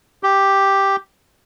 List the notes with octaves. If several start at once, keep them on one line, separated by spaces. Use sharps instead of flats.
G4